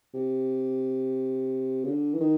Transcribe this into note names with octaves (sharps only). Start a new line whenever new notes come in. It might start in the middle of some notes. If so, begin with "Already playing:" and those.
C3
C#3
D3
E3
D#3